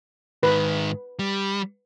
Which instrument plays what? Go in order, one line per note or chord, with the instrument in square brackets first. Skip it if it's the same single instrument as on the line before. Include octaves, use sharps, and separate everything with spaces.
[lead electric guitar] G#2 D#3 [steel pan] B4
[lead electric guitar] G3